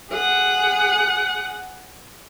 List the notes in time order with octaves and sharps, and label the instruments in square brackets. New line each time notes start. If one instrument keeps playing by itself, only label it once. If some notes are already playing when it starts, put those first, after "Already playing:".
[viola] G#4 F#5